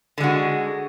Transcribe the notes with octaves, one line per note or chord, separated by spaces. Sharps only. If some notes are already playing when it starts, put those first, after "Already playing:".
D3 G#3 F#4